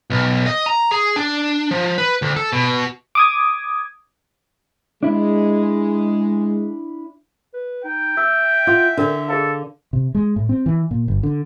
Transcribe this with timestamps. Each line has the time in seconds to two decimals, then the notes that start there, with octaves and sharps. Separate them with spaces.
0.10 B1
0.47 D#5
0.66 A#5
0.91 G#4
1.16 D4
1.71 F3
1.98 B4
2.22 D2
2.36 A4
2.53 B2
3.15 D6 D#6 G#6
5.03 G#3 D4 E4
7.54 B4
7.84 D#4 G5
8.17 E5 E6
8.67 F4 D#5 F#5 D6
8.97 D3 D4 A#4 D5
9.29 G#4 A4 D#5 F5
9.93 C3
10.15 G#3
10.36 A2
10.49 C4
10.66 E3
10.91 A#2
11.08 G1
11.23 D3